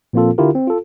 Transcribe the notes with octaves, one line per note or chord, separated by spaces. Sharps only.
A#2 F3 A#3 C4 F4 A4
D3 E4 F4 G4 A#4
C4
F4 A4